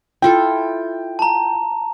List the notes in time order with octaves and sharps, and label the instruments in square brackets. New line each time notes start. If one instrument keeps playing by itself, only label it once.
[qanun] E4 F4 A4 [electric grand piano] G5
[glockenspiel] A5 A#5